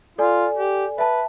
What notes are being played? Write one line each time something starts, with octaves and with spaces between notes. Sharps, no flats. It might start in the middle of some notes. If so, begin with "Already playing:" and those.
F4 A4 D5 G#5
G4
B4 E5 A5